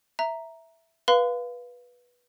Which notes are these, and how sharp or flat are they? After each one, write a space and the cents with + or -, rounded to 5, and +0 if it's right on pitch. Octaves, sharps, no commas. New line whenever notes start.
E5 +0 A#5 +0
B4 -15 F5 +0 C6 -45